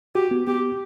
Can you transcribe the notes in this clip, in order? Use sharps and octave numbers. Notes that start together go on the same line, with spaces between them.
F#4 G4
B3
B3 G4